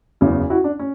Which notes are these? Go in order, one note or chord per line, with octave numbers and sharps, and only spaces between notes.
F#1 E2 C#3
E4 F#4
D4
C#4